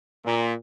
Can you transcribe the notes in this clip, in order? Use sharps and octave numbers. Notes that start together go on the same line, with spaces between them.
A#2